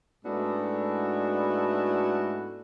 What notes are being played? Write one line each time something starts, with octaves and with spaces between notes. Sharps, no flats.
G#2 A3 B3 D4 E4 F#4